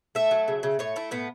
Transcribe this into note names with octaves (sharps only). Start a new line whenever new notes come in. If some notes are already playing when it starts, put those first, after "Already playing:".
A3 E5
F#3
C#3
C#3
A2 C#5
A3 E4
A2 B3